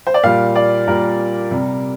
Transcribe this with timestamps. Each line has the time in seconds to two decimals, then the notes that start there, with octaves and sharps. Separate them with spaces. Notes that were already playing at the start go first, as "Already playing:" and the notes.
0.07 C5
0.14 D5
0.23 A#2 G3 F5
0.56 D5
0.87 A#2 G3 A#4
1.51 C3 G3